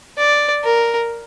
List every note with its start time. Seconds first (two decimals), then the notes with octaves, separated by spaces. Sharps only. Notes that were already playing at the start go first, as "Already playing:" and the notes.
0.18 D5
0.64 A#4